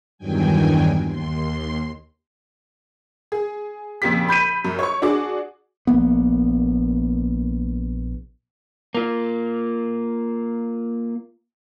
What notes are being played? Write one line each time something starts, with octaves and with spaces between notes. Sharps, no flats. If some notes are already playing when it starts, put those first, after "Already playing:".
E2 G2 D#3 F#3 G5 G#5
D#2 C6
G#4
F2 A#2 C#3 G4 B6
B5 G6 B6 D#7
F#2
C#5 C#6
D4 F#4 G#4 D6
A#1 F3 A#3 B3
A#3 F4